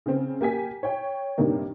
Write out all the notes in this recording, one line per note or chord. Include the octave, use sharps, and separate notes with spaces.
C#3 C4
A#3 G4 G#5 B6
C#5 G5
G2 C3 D#3 A#3 D4